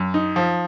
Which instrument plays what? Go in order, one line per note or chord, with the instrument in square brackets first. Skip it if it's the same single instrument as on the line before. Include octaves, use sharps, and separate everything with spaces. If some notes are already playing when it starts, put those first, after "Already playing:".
Already playing: [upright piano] F#2
D#4
F3